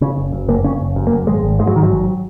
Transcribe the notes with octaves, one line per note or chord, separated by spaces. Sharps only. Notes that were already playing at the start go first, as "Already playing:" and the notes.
C#3 C#4
F#1
F#2
F#1 A#3
C#3 C#4
F#1
F#2
A#3
F#1
G#1 G#3
G#1
G#2 G#3
F#3
G#2 D#3
F#3
G#1